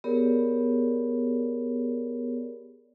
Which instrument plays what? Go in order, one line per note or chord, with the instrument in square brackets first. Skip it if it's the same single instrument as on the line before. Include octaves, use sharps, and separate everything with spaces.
[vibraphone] B3 G4 G#4 A#4 C#5 D5